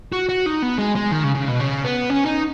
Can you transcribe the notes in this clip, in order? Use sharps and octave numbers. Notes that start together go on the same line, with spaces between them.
F#4
F#4
D#4
B3
G#3
G#3
D#3
C#3
C#3
B2
C#3
B3
C#4
D#4